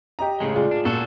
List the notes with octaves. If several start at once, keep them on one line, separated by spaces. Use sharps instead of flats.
G4 D#5 A#5
A2 C#3 G#3
F4 G#4 D5
D4
A#2 F#4 A4